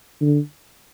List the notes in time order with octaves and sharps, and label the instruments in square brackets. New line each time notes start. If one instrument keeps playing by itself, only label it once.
[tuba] D3